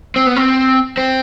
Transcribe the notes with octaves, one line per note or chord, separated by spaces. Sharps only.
C4
B3
C4
C4